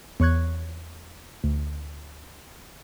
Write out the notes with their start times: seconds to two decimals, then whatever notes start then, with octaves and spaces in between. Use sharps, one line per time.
0.20 E2 C#5 C#6 F#6 G#6
1.44 D2